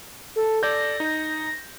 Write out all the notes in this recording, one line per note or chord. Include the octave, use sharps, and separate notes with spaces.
A4
A4 D5 G6 A#6
D#4